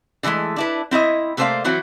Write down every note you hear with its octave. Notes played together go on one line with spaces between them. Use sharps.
D3 E3 F#3 G#3 A3
D4 E4 B4
C4 E4 C#5 D#5
C3 A3 A#3 C5 D5 F5
E3 F#3 C4 E4 F#4